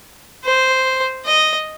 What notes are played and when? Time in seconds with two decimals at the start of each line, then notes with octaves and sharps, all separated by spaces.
0.45 C5
1.26 D#5